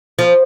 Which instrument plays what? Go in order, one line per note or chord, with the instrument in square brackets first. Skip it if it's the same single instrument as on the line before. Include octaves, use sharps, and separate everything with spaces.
[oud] F3